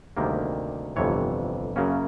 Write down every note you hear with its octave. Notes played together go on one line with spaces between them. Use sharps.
D2 C3 D#3 G3 A#3
G1 F2 C3 E3 C#5
F#2 C#3 F#3 A#3 C#4